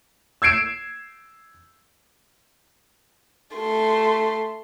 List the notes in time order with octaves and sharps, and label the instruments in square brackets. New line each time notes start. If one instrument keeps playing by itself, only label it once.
[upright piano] E6 G#6 C7 D7 E7
[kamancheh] A3 C6